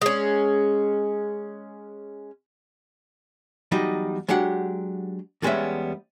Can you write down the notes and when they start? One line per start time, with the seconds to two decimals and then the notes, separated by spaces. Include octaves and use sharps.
0.02 G#3 C#4
3.72 E2 F#3 G3 D#4
4.28 F#3 G#3 D4 G4 F#5
5.42 E2 G3 G#3 B3 C#4 E5